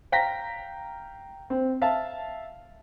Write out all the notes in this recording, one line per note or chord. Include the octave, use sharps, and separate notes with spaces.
F5 G5 A#5 A#6 B6
C4
E5 F5 A5